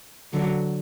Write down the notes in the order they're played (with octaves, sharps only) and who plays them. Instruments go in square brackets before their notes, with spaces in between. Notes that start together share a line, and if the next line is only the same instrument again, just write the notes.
[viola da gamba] D3 F#3